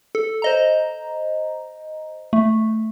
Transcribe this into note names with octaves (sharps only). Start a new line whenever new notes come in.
A4
C5 D#5 A#5
A3